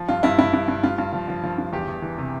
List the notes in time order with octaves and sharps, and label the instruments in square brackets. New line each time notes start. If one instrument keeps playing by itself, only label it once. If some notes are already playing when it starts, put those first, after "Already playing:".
Already playing: [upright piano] F3
G2 F4
G2 E4
G2 E4
G2
G2
G2 F4
G2
F3
F3
F3
G2
E2 G4
E2
E3
C3